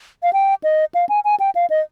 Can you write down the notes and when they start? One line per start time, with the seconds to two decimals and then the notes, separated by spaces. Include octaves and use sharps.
0.23 F5
0.33 G5
0.64 D#5
0.95 F5
1.09 G#5
1.25 G#5
1.40 G5
1.55 F5
1.70 D#5